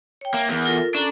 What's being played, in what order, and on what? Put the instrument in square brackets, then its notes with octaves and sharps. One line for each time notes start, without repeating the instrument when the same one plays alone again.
[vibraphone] C#5 G5
[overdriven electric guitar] A#3 [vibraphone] E5
[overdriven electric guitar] E2 [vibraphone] A#4
[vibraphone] F4 A4 A#4
[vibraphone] C#4 A4 A#5 [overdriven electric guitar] D4